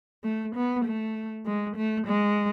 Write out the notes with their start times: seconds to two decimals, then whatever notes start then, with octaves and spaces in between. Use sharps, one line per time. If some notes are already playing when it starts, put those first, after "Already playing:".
0.24 A3
0.56 B3
0.85 A3
1.46 G#3
1.77 A3
2.07 G#3